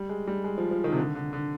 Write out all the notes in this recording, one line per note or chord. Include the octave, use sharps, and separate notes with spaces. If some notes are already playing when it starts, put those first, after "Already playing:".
Already playing: G3
G#3
G3
G#3
F3
F3
D#3
C3
D3
D3
D3